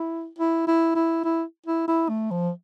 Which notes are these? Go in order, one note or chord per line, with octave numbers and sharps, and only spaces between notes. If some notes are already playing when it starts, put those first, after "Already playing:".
Already playing: E4
E4
E4
E4
E4
E4
E4
A3
F3